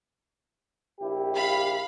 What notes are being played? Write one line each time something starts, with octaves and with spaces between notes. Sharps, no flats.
A#1 E4 G4
F5 B5